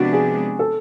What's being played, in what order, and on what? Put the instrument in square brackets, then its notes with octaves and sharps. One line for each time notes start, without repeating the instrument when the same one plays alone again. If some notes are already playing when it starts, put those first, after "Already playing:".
Already playing: [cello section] C3 F3 G#3 B3 D4 [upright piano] F#4
[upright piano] G#4
A4